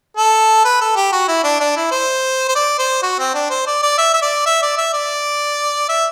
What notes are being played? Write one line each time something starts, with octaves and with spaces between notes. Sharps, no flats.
A4
B4
A4
G4
F#4
E4
D4
D4
E4
C5
C5
D5
C5
F#4
C4
D4
C5
D5
D5
E5
E5
D5
E5
D5
E5
D5
E5